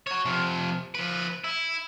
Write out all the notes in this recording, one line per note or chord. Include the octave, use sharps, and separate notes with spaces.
F#4 C#5
C3 F3
F3 B4
E4